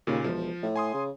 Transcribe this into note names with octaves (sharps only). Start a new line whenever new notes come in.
D#2 A#2 C#3
E1 F3
A2
G#5 C6 D#6
C#3